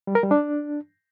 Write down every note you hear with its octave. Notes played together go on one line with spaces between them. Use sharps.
G3
A#4
G3
D4